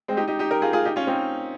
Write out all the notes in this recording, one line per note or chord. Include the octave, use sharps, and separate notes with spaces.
G#3 C4
D#4 G4
D#4 G4
D#4 G4
G4 A#4
F4 G#4
F4 G#4
D#4 G4
C#4 F4
C4 D#4